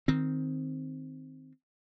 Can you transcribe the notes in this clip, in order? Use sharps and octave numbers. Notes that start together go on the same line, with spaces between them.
D#3 C4